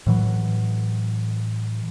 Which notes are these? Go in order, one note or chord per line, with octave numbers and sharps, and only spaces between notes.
A2 E3 F#3